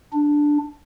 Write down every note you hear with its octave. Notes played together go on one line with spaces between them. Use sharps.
D4